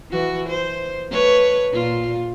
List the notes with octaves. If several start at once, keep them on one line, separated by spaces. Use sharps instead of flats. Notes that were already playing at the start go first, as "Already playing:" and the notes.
E3 F#4
C5
A3 B4 C#5
A#2 F4